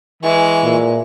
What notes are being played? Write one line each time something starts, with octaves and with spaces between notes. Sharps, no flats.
E3 G#3 C#6
A#2